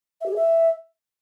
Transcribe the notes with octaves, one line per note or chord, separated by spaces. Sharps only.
E5
G4
G#4
E5